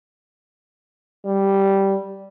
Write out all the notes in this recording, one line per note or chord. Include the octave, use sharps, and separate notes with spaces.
G3